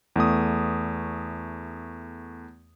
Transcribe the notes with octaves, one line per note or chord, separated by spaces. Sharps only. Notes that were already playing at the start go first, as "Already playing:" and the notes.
E2 A3 D#6